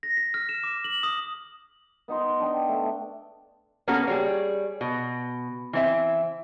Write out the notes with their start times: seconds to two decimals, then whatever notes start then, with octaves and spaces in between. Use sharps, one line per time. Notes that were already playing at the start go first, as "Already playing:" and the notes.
0.03 A#6
0.17 B6
0.34 F6
0.49 E7
0.64 D6
0.84 F#7
1.03 D#6
2.08 B3 D#4 C6
2.40 D4 G5
2.69 A3
3.88 A#3 B3 C#4 F#4 A4 A#4
4.07 G3 G#4 C#5
4.81 B2
5.73 E3 C4 E5